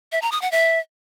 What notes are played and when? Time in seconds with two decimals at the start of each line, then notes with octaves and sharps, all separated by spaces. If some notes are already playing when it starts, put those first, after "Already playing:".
0.12 E5
0.22 A#5
0.32 D#6
0.42 F#5
0.52 E5